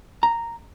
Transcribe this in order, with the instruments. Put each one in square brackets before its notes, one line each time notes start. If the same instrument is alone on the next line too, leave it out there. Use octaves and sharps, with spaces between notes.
[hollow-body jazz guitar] A#5